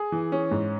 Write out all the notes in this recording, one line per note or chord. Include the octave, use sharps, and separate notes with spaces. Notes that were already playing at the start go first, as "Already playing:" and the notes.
Already playing: G#4
E3
C#4
G#2